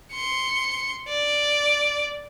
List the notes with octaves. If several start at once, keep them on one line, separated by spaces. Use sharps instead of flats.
C6 C#7
D5